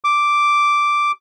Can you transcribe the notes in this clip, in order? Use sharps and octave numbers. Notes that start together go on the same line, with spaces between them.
D6